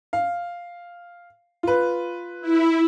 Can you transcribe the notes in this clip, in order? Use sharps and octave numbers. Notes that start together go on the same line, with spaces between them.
F5
F4 B4
E4